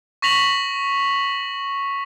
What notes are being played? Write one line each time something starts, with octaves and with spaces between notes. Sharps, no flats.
C#6 A#6 B6 F7 F#7